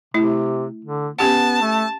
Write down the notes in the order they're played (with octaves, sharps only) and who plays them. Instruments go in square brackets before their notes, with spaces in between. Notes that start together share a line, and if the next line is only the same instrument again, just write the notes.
[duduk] C3 [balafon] A3 E4
[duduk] D3
[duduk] B3 [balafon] C#4 G4 F#5 [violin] A5
[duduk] A3